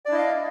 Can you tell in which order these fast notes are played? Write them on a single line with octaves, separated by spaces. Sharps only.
D5 D4 E4 D#5 F5